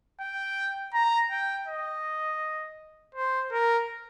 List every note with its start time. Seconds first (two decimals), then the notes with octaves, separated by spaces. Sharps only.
0.20 G5
0.94 A#5
1.30 G5
1.67 D#5
3.15 C5
3.52 A#4